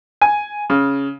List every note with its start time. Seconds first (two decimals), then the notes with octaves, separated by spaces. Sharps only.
0.22 G#5
0.70 C#3